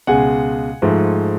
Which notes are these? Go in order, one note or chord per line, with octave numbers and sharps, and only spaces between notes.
C#2 B2 G#3 F#5 G#5
G#2 F3 A3